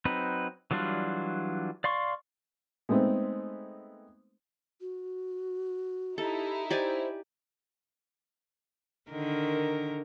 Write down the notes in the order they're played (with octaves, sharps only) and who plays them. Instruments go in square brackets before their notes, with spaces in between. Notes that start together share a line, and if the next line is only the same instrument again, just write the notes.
[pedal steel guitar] F#3 C4 D#4 B4
E3 F#3 G3 D4 F4
D5 F5 C6 C#6
[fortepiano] G#3 A3 B3 C4 D#4
[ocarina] F#4
[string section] D#4 E4 [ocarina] G4 [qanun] A4
[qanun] G4 D5 G#5 [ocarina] C5
[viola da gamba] D3 D#3 A#4